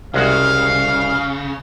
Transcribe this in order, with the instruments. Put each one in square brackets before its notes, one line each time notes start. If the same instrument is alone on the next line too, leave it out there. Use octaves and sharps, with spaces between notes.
[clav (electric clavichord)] C2 G#3 F#4 [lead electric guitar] C#3 [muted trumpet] F5